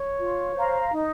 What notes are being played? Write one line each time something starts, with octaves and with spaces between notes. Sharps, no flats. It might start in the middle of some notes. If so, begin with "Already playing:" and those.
Already playing: C#5
F4
C5 F5 A#5
D#4